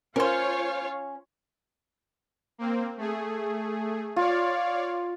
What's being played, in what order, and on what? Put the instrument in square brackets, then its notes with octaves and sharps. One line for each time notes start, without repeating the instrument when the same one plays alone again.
[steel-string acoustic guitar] C#4 [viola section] F4 C#5 F5 [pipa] A#4 C5
[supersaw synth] A#3 C4
A3 G#4
[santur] F4 [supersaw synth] C#5 D5 F5